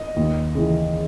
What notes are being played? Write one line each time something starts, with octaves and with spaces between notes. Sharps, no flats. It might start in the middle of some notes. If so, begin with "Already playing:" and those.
Already playing: D#5
D#2
C#3 E3